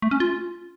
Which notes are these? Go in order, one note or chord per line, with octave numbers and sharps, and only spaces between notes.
A3
C#4
F4